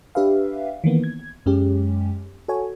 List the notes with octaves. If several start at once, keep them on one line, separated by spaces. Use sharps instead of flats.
D4 G4 B4 E5 F5
D#3 E3 A#3 B3
G#6
F#2 G#3 C#4 G4
F#4 A4 C#5 G#5